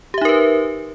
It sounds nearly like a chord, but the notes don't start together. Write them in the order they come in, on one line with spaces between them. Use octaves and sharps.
G4 E5 D#4 A#4 B4